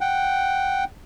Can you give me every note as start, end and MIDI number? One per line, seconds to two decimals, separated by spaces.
0.01 0.84 78
0.01 0.84 79